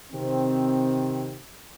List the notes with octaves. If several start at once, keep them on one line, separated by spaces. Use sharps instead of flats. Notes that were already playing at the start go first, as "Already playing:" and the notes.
C3 D#3 C4